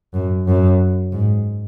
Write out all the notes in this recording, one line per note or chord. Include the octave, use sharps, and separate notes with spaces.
F#2
F#2
G#2